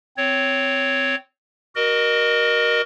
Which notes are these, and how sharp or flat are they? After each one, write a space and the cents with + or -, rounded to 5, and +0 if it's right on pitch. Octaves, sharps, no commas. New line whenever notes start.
C4 -10 C#5 +5
F#4 +25 A#4 +15 D#5 -25